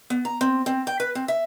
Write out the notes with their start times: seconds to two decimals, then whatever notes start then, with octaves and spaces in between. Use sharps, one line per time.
0.10 B3
0.25 A#5
0.41 C4
0.66 C4
0.87 G5
1.00 B4
1.15 C4
1.28 E5